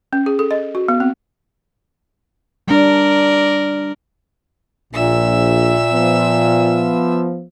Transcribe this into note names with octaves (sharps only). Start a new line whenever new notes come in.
C#4
G#4
A4
D#5
F#4
B3
C4
G3 D4 A#4 D5
A#1 A#2 E5 E6
F3 B3